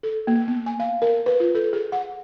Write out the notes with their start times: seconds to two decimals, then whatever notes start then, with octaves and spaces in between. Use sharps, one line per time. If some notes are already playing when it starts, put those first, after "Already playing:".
0.03 A4
0.27 A#3
0.48 B3
0.66 G#5
0.80 F5
1.02 A#4
1.26 B4
1.40 F4
1.55 A4
1.73 G#4
1.92 F#5